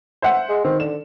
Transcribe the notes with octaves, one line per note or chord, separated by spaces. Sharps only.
C5 E5 F#5
G#3
D#3 C4
D3 E7